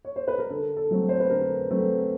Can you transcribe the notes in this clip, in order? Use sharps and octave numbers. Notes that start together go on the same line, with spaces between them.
C#5
C5
B4
A#4
D3 A4
A4
F#3 A3 C4
C5
B4
D3 A#4
F#3 A3 C4